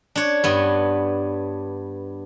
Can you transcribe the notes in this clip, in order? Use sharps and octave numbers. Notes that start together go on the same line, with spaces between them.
D4 C#5
G2 B3